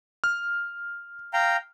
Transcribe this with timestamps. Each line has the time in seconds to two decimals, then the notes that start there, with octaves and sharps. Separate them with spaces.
0.24 F6
1.33 F5 G5 A#5